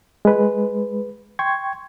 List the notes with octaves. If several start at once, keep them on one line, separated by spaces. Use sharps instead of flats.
G#3 B4
G5 C6 C#6 G#6